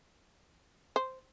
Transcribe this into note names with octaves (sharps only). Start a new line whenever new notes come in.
C5